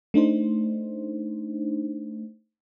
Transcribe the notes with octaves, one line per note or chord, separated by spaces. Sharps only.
A3 D4 D#4 C5